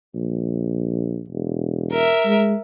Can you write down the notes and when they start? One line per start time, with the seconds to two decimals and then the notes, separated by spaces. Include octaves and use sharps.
0.15 A#1
1.30 E1
1.92 A#4 E5
2.26 G#3